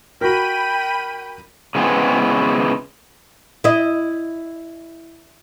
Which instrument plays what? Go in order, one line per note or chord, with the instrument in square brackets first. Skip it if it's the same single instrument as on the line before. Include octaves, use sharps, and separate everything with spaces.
[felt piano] F#4 A#4 [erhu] G5 [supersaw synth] B5 D#7
[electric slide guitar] C#3 E3 G#3 B3 C4
[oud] E4 D#5